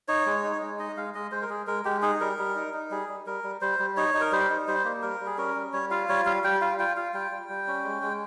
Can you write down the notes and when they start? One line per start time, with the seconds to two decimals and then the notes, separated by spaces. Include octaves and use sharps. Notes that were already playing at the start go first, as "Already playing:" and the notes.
0.08 D#4 C#5
0.26 G#3
0.44 D#4
0.62 G#3
0.79 D#4 D#5
0.97 G#3 F5
1.15 G#3 D#5
1.32 G#3 C5
1.42 A#4
1.49 G#3 G#4
1.67 G#3 A#4
1.85 G#3 G4
2.02 D#4 G#4
2.20 G3 A#4
2.38 G3
2.55 D#4
2.73 D#4
2.91 G3 G#4
3.09 G3
3.26 G3 A#4
3.44 G3
3.61 G3 C5
3.79 G3
3.97 D#4 C#5
4.14 D#4
4.21 A#4
4.32 G3 C5
4.50 D#4
4.67 G3 C5
4.85 A#3
5.02 G3 A#4
5.20 G3
5.27 G#4
5.38 C#4 A#4
5.56 G3
5.73 G3 C#5
5.91 F4 F5
6.09 G3 C#5
6.25 G3 F5
6.44 G3 G5
6.61 F4 F5
6.79 F4 G5
6.96 F4 F5
7.14 G3 G5
7.31 G3
7.49 G3
7.67 C#4
7.84 G#3
8.03 G#3